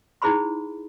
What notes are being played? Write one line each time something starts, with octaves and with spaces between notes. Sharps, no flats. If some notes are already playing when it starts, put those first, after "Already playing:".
D#4 E4 G#4 C5 B5 C6